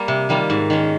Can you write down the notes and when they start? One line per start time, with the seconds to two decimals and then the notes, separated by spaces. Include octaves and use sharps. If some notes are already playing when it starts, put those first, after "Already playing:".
Already playing: G3 A#3
0.08 C3
0.29 D#3 G3 A#3 F4
0.50 G#2
0.70 D#3 G#3 C#4